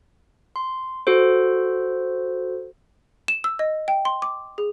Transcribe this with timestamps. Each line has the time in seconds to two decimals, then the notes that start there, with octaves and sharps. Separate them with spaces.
0.56 C6
1.07 F#4 A4 C5
3.28 E7
3.44 E6
3.59 D#5
3.88 G5
4.05 C6
4.22 D6
4.58 G#4